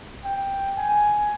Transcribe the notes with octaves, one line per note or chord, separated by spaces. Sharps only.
G5
G#5